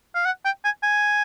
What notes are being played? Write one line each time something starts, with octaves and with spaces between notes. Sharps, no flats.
F5
F#5
G5
G#5
G#5